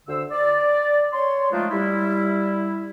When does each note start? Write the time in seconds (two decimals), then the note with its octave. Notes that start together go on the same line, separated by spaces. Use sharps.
0.07 D2 D3 C5 E6
0.31 D5
1.13 C#5 C6
1.52 F3 G#3 A3 D4 D#4 F4
1.71 G3 E4